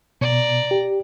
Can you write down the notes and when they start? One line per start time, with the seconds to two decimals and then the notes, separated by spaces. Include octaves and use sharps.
0.21 B2 D5 A#5
0.71 G4